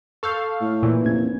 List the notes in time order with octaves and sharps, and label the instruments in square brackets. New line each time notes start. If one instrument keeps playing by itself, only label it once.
[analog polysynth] A4 F5 [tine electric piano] C#6 E6 G6
[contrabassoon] A2
[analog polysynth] A#2 E3
[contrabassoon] F1 [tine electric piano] C#4 G#6